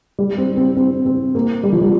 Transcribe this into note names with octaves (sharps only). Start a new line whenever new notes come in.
G3
C4
C4
C4
C4
A#3
G3
F3
G3